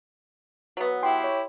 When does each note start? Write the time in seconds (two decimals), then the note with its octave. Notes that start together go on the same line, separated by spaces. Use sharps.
0.77 F#3 B3
1.03 E4 G4 G5 C6
1.24 C#5